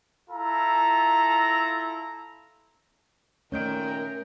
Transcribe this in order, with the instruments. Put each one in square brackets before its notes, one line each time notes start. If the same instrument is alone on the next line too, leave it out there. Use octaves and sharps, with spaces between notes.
[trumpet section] E4 F4 A4 A#5
[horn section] A#2 D#3 [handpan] A3 C#4 [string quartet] A#4 [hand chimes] C#5 G6 D7